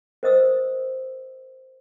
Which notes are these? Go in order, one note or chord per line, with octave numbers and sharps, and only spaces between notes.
A#4 C5 D#5 D#6 E6